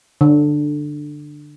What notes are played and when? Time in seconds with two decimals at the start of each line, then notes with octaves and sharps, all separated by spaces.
0.21 D3